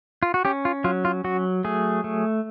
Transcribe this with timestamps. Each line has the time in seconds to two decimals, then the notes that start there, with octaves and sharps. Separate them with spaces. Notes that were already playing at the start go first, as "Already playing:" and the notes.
0.23 F4
0.34 F#4
0.45 C#4 G4
0.65 F4
0.84 F#3 F4
1.05 F4
1.24 F#3 F#4
1.64 A3 G#4
2.04 A3